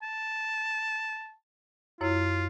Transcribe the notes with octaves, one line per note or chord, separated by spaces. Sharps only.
A5
F#2 E4 F4 C#5